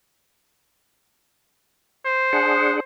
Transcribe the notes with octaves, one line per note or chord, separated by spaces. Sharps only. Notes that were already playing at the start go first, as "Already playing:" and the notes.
C5
D4 G#4 F#5